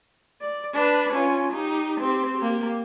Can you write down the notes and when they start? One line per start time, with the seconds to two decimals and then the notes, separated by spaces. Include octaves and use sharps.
0.41 D5
0.74 D4 B4
1.13 C#4 F4
1.53 D#4 G4
2.00 C4 G4
2.37 A#3 G4